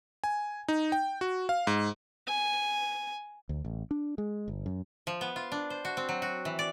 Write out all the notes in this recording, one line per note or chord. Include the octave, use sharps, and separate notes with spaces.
G#5
D#4
G5
F#4
F5
G#2
G#5
D2
A1
D4
G#3
G1
F#2
F3
B3
F4
D4
C5
F#4
C4
F#3
F#4
E3
D5